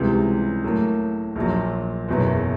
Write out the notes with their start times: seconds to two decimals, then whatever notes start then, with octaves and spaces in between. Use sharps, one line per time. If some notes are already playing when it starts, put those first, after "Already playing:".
Already playing: C#2 C3 E3 G3
0.64 A2 F#3 A#3
1.36 A#1 A#2 F#3
2.08 F#1 E2 B2 F#3